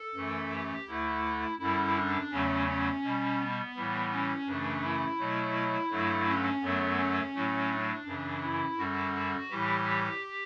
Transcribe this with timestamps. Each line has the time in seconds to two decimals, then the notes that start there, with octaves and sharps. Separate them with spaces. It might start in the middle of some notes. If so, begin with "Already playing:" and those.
Already playing: A4
0.15 F#2 E3 A3
0.52 G4
0.87 D2 D3 A3 E4
1.59 F#2 D3 G3 E4
1.96 D4
2.31 E2 C#3 F#3 A3 C#4
2.68 C#4
3.03 B2 G3
3.39 B3
3.75 A2 E3 G3
4.11 C#4
4.47 F#2 C#3 E3 A3 D4
4.82 E4
5.18 B2 F#3 A3
5.90 G2 D3 F#3 A3
6.26 C#4
6.62 F#2 D3 F#3 A3 B3
6.98 C#4
7.34 A2 F#3 A3
7.70 D4
8.05 F#2 C#3 E3
8.42 E4
8.78 F#2 D3 G3 F#4
9.50 A2 E3 G3 G4